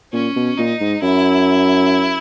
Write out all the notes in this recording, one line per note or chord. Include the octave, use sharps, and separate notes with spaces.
A#2 C#4
B2
A#2 D#4
G#2
F#2 E4